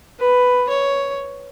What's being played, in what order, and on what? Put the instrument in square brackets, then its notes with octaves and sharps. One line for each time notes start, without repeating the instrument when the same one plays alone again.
[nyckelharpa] B4
C#5